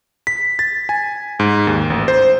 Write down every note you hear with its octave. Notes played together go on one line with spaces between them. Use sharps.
B6
A6
G#5
G#2
D#2
A1
C5